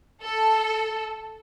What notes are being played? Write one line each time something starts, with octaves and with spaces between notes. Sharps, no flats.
A4